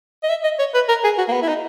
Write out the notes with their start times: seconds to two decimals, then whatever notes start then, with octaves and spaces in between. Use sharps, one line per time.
0.23 D#5
0.30 E5
0.44 D#5
0.59 C#5
0.74 B4
0.89 A#4
1.04 G#4
1.18 F#4
1.28 A#3
1.33 B3
1.42 E4
1.48 D#4